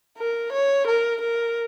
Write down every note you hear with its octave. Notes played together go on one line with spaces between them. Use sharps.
A#4
C#5
A#4
A#4